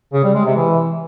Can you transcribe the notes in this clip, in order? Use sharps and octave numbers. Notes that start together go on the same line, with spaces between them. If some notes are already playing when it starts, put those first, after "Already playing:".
C#3
G3
G#3
C3
E3